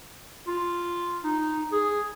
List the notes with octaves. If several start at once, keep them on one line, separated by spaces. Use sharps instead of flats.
F4
D#4
G#4